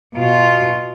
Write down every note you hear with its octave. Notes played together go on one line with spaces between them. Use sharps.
B2 F4